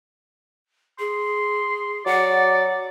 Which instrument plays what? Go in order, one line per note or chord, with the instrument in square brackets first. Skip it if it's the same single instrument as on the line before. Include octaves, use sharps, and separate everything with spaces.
[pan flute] G#4 [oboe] C6
[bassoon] F#3 [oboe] D5 [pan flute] F#5